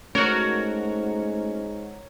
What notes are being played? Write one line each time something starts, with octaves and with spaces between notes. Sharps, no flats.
G#2 A3 C#4 F#4 A#4 C#5